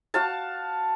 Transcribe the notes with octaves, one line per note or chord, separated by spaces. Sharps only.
F#4 F5 A5